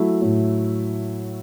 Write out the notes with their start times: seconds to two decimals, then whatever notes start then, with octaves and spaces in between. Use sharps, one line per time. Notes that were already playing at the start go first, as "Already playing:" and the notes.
Already playing: F#3 A3 E4
0.22 A2